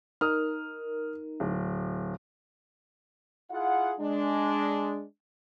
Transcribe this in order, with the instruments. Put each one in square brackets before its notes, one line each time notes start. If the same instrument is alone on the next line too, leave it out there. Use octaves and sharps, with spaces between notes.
[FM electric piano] D#4 A#4 [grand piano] D#6 F6
[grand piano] D1
[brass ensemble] E4 F4 G#4 F#5
G#3 D4